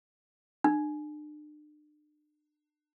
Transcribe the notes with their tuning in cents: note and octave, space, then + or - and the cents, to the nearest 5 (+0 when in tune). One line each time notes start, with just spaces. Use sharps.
D4 +40